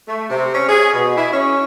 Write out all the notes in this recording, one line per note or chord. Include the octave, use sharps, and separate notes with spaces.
A3
C3
C#4
G#4
B2
E4
C#4